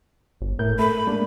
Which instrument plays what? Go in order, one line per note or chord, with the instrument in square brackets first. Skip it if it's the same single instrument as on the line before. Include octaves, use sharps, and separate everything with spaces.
[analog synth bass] G1
[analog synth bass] A2 [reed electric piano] A#4 G6
[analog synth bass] A3 [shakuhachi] B5
[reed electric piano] G#3 A#3 [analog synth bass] D4